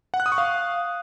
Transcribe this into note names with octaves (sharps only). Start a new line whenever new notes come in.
F#5
F#6
D#6
C#6
F5